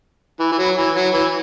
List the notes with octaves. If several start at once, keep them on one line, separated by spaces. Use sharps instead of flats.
E3
E3
F#3
E3
F#3
E3